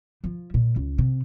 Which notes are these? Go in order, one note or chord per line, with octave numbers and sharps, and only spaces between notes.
F3
A#2
C#2
C3